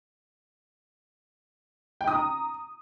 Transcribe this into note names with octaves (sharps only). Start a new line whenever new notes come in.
G5
D#6
A#5